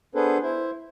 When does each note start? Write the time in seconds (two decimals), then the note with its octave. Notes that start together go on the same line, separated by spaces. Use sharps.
0.15 B3 D4 G#4 A4 B4 C5
0.43 E4 C5